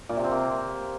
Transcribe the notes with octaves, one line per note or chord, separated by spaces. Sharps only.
A#2
C3
C4
A#3